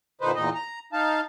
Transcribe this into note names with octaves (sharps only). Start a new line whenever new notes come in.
A#2 D3 D#4 B4 C5
E2 A#2 D#4 D#5
A#5
D#4 F5 A5